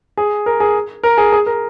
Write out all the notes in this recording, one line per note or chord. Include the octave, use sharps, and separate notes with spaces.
G#4
A#4
G#4
A#4
G#4
G#4
A#4